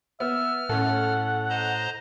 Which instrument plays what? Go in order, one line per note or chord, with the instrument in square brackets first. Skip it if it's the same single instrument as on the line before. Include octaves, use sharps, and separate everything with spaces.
[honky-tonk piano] B3 [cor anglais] E5 [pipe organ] F6
[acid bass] A2 [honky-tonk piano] C#4 A4 [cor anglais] F#5
[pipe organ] C5 D#5 A#5